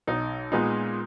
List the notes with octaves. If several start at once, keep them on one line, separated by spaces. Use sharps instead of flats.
B1 D#4
A#2 G#3 B3 D#4